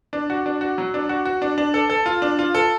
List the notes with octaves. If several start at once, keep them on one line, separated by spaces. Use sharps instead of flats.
D4
F#4
D4
F#4
F#3
D4
F#4
F#4
D4
D4
A4
A4
F4
D4
F4
A4